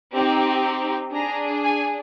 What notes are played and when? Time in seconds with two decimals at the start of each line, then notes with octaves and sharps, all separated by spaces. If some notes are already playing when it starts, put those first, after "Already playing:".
0.13 C4 D#4 G4
1.13 D4 G#4 A#5
1.64 G#5